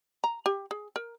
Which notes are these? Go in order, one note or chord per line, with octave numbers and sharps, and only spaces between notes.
A#5
G4
G#4
A#4